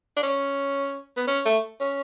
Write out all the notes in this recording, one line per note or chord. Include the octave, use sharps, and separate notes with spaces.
D4
C#4
B3
C#4
A3
C#4